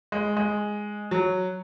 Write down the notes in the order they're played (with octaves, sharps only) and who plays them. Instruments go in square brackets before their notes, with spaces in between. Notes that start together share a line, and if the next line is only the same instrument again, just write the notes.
[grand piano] G#3
G#3
F#3